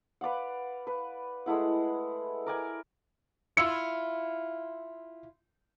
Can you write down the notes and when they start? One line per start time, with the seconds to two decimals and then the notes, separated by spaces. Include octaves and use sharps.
0.21 B4 D5 F5 F#5
0.87 B4
1.46 G#3 A3 E4 F#5
2.46 A#4 D5 G#5
3.57 E4 F4 E6 C#7